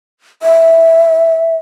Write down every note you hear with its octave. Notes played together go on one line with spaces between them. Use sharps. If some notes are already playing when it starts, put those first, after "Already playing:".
E5